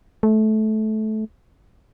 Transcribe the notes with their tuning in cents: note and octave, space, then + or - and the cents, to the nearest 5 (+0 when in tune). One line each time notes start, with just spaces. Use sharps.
A3 -20